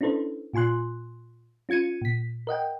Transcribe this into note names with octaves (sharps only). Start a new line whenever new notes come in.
C#4 D4 E4 A4 B4 C5
A#2 F4 G#5 C6 F#6
C#4 F4 G#6 C#7 D#7
A#2 B6
A#4 D#5 F#5 G5